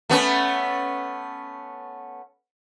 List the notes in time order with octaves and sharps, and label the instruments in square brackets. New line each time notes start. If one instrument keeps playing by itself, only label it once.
[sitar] A3 B3 C#4